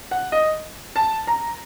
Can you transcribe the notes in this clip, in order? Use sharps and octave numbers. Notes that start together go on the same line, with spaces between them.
F#5
D#5
A5
A#5